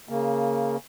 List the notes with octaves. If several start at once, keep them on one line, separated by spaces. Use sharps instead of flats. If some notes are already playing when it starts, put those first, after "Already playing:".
C#3 A#3